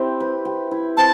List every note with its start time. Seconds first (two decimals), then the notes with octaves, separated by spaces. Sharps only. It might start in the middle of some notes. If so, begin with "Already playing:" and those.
Already playing: C4 E4 G4
0.20 B4
0.45 G4
0.71 E4
0.97 C4 A5